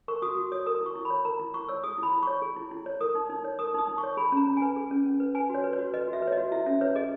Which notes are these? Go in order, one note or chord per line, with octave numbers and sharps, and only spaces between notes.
A#4 C#6
F#4 D#6
F#4
C#5 D#6
A#4 D#6
E4
C#6
E4
B5
C#5
A#4 A#5
E4
E4 C#6
C#5 E6
G#4 D#6
E4 B5
E4
C#5 C#6
G#4
E4
E4
C#5
A#4 D#6
D#4
D#4
C#5
A#4 D#6
D#4 D#6
D#4
C#6
C#5
G#4 B5
C#4 A#5
C#4
B4 G#5
G#4
C#4
C#4
B4
B4 G#5
F#4 C#5
B4
C#5
F#4
B4 D#5
F#4
E5
B4
C#5
F#4 D#5
E4 E5
C#4 E5
B4 C#5
G#4 D#5